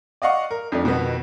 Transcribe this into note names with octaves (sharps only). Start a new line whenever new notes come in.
D5 D#5 F5 F#5 C#6
A#4
F2 A3 D4
F2 B2 D#3 B3